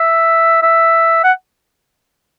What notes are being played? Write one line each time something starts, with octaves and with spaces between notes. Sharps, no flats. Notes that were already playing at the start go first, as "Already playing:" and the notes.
Already playing: E5
E5
F#5